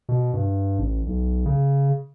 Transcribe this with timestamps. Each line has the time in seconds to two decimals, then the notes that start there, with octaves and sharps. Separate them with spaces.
0.09 B2
0.34 G2
0.79 A1
1.06 B1
1.46 C#3